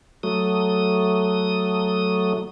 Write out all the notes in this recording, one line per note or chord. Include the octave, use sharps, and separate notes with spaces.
F#3 A3 D#6